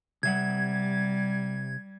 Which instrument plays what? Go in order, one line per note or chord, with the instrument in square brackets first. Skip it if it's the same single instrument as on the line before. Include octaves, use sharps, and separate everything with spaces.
[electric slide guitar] C3 E5 F#5 [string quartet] G3 [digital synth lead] G#6